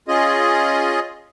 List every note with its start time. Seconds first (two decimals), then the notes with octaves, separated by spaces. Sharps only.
0.08 C#4 F4 G#4 D#5